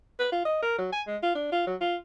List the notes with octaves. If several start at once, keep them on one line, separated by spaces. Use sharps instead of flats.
B4
F4
D#5
A#4
F#3
G#5
G#3
F4
D4
F4
F#3
F4